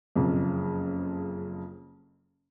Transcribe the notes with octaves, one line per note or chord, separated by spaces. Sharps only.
F#1 F2 C#3